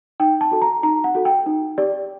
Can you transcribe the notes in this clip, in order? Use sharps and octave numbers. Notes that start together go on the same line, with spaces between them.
D#4 G5
A5
F#4 A4
A#5
D#4 A#5
F#5
F#4 A4
G5
D#4
G4 D5